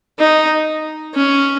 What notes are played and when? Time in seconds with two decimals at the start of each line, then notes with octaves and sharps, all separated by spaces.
0.19 D#4
1.15 C#4